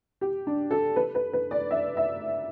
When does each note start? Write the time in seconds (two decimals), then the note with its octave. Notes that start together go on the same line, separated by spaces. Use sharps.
0.21 G4
0.47 D4
0.71 A4
0.96 B4
1.15 B4
1.33 B4
1.51 D5
1.71 E5
1.97 E5